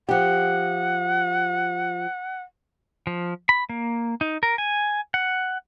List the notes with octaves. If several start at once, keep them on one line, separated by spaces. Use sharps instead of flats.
F3 G4 F#5
F3
B5
A#3
D#4
A#4
G#5
F#5